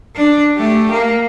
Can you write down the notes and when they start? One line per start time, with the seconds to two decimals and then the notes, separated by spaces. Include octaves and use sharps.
0.16 D4
0.56 A3 G4
0.91 A#3